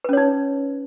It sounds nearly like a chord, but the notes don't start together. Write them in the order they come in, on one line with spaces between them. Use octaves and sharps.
B4 C#4 C#5 D#4